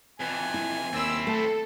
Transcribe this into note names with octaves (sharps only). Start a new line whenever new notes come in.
F2 E3 G#5
E4
D#2 C4 E4 E6
A3 A4